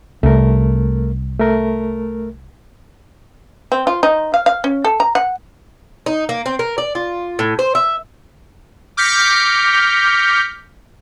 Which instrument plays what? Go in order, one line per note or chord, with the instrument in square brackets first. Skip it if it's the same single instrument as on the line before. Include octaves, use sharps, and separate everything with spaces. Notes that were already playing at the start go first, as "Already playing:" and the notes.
[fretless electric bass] C2 [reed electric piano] A3 A#4
[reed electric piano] A3 A#4
[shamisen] C4
F4
D#4
F5
F5
C#4
A4
A#5
F#5
[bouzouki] D#4
A#3
C4
A#4
D5
F4
A2
C5
E5
[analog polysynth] D6 F6 G6 A#6 B6 C#7